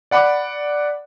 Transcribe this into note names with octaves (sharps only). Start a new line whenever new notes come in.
D5 F#5 B5 D6